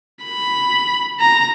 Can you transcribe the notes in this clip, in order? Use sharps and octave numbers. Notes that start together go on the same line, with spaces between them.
B5
A#5